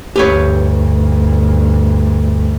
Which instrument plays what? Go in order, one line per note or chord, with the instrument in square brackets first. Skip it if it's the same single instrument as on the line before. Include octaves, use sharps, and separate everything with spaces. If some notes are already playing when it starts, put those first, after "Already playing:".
[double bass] D2 G2 [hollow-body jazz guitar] G4 B4 C#5